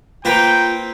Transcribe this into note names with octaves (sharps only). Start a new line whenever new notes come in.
A#3 C4 F4 B4 G5 A#5